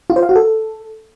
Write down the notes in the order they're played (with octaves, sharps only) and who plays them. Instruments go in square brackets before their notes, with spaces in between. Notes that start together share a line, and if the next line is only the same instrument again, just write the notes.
[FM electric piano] F4
C5
F5
F#4
A4